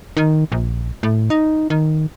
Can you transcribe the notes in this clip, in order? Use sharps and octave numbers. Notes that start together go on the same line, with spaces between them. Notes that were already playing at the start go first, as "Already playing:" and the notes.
D#3
A#1
A2
D#4
D#3